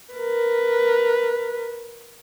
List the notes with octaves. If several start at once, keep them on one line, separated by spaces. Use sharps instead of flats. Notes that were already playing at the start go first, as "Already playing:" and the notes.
A#4 B4